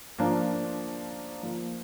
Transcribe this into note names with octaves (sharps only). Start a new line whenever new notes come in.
F3 A#3 D4 F4
F3 A#3 F4